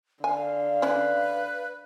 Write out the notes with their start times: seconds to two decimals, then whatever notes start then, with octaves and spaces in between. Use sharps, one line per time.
0.24 D3 F5 G#5
0.82 C#4 E4 B4 D5